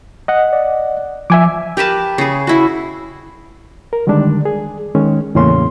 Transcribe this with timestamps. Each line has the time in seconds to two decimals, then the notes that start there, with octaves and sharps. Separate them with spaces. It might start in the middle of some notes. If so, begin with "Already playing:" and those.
0.28 D#5 F#5
0.52 D5
1.30 F3 E5 G#5 D6
1.77 G4 A#4 B4 A5
2.18 C#3 G#4
2.47 E4 F#4
3.93 A#4
4.07 D3 D#3 G3 G#3 D4
4.45 G#4
4.95 D#3 G#3 C#4
5.35 E2 A2 C#3 A#3 C#4 C6